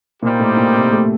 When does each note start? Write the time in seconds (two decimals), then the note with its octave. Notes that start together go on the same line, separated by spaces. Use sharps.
0.22 A#2 G3 A#3 D#4 G4 C5
0.40 A2
0.57 A#2
0.75 C3
0.93 A3